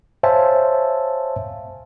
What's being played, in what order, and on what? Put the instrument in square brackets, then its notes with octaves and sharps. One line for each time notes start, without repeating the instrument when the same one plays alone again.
[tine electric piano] C5 C#5 E5 F5 G#5 A5